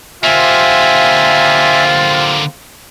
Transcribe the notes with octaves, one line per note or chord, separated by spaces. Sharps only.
D3 A#3 F4 G4 C5 E5 F5 G#5